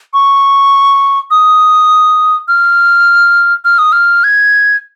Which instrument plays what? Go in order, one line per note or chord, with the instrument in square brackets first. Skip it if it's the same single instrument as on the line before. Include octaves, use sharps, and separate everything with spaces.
[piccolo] C#6
D#6
F6
F6
D#6
F6
G#6